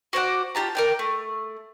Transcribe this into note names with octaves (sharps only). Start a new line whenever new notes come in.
F#4 C5 D5 F#5
F4 G4 A5 A#5
A#4 D5 G5
A3